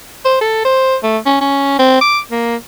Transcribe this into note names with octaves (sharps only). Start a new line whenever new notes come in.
C5
A4
C5
A3
C#4
C#4
C4
D6
A#3